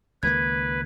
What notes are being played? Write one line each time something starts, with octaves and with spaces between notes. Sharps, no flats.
C#2 D#3 A#3 B4 G#6